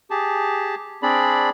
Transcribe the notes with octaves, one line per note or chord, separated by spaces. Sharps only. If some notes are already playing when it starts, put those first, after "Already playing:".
G4 G#4 A5
C4 D4 G#4 D5 B5